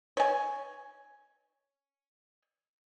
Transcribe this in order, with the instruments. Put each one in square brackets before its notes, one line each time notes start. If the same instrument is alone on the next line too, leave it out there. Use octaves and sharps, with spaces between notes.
[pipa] C#5 G#5